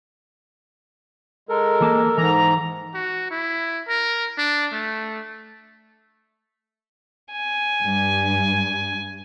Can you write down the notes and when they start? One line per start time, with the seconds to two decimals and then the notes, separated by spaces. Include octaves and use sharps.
1.49 G#3 A4 A#4
1.81 E3 A#3 A5
2.18 G#2 E3 A#5
2.94 F#4
3.31 E4
3.88 A#4
4.38 D4
4.73 A3
7.32 G#5
7.84 G2